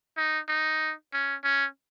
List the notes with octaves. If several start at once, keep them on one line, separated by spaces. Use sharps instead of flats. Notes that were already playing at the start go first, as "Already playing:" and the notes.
D#4
D#4
C#4
C#4